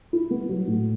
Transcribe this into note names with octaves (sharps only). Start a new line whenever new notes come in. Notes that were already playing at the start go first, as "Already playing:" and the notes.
E4
B3
F#3
A2